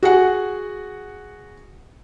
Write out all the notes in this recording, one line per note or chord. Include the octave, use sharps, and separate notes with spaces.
F#4 G#4 F#5